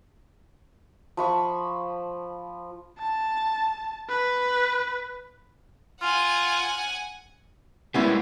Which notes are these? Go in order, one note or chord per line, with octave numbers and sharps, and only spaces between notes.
F3 B5 C#6
A5
B4
F4 F#5 G#5
G3 G#3 A#3 B3 C#4 E4